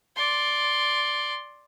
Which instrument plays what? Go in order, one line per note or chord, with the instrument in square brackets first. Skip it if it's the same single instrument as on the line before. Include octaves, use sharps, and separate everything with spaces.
[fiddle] D5 C6